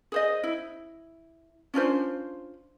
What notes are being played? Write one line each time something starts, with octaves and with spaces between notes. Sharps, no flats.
G#4 C5 D#5
E4
C#4 D4 F4 C5